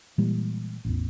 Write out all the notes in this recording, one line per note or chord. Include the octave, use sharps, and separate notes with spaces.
A#2 E3 G3 G#3
A1 E2